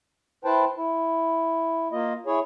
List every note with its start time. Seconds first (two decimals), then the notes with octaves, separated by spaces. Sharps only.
0.45 E4 B4 C5 G5 A5
0.77 E4
1.92 A#3 F4 D#5
2.26 E4 G#4 C#5